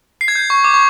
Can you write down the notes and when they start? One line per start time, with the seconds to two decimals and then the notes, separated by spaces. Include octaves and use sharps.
0.21 C7
0.28 G#6
0.35 G6
0.50 C#6
0.64 D6
0.74 C#6